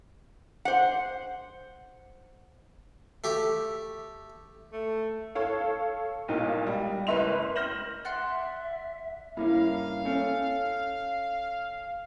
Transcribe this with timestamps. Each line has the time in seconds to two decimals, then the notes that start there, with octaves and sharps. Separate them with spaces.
0.65 C5 F#5
3.24 A3 G4
4.73 A3
5.35 A4 C#5 F5
6.28 B1 A#2 D#4
6.67 G3
7.07 F#1 B4 E5 C6 F7
7.56 F6 G6 A#6 E7 F#7
8.05 D5 E5 F#5 C6
9.37 G2 A#3 C#4 E4 F5
10.05 C#4 A4 C#5